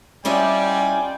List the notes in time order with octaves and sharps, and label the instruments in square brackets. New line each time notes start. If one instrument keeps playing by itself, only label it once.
[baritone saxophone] G3 [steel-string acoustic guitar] C#4 E4 D#5 [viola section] F4 D5 G5 [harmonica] G#5